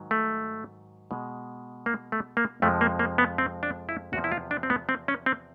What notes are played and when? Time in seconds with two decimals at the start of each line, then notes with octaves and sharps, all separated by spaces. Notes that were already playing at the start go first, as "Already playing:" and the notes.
Already playing: G#2 D#3 F#3
0.11 A3
1.11 B2 G#3
1.86 A#3
2.12 A3
2.37 A#3
2.62 F2 C3 F3 G#3 A3
2.81 A#3
2.99 A#3
3.18 B3
3.38 C4
3.63 D4
3.89 E4
4.13 E2 C3 F3 F#4
4.24 E4
4.32 F4
4.51 D4
4.63 C4
4.70 B3
4.89 C4
5.08 C#4
5.26 C4